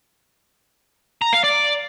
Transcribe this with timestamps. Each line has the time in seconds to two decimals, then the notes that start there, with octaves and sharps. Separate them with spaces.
1.22 A#5
1.33 F5
1.44 D5